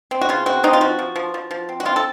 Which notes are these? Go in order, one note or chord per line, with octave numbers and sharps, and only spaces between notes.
C4
F#4
C#3 F4
C4 F#4
C4 D#4
F4
F3 F#4
F3
F3
F3
F3
C4
F#4
C4 F4
A4